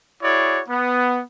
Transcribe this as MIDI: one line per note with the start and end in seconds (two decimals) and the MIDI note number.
0.22 0.60 64
0.22 0.60 66
0.22 0.60 68
0.22 0.60 73
0.22 0.60 74
0.68 1.21 59